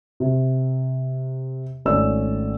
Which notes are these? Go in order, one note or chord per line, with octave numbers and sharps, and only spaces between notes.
C3
G#1 A3 C#4 D5 E6